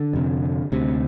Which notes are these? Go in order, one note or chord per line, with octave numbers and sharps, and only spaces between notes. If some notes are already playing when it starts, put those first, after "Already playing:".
Already playing: D3
F2 C3
D2 C3